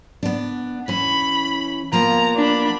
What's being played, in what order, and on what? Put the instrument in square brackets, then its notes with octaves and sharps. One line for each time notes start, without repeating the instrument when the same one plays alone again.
[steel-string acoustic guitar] B3 D4
[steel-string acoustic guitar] E3 C#4 [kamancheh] B5
[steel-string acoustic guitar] F3 A#3 B3 [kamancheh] A#5
[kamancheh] D4 B5